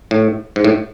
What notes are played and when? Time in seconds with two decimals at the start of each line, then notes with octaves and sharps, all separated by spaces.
0.11 A2
0.56 G#2
0.64 A2